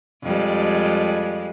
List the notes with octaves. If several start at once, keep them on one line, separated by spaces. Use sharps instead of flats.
F2 G3 G#3